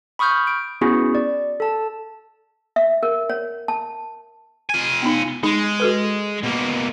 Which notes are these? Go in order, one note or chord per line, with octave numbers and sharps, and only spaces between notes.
B5 C#6 D#6 F6 G6
D7
B3 C#4 E4 F#4 G#4
D5
A4 A5
E5
A#4
C#5
A5
F4 G#5
B3 D#4
G#3 D#4
F#4 A4 B4
B2 A#3